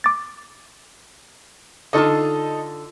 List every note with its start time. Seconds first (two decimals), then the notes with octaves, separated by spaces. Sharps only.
0.04 D6 A6
1.93 D3 D#4 F4 A4 D#5 A5